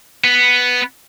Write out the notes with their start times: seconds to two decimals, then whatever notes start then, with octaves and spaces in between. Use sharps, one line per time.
0.24 B3